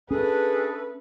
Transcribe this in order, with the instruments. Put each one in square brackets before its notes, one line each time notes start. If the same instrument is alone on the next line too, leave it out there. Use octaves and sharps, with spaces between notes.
[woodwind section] A3 D4 A4 [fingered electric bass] C#4 [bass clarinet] G#4 [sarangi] B4